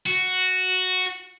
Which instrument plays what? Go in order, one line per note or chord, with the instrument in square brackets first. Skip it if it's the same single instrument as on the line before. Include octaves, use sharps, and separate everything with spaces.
[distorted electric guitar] F#4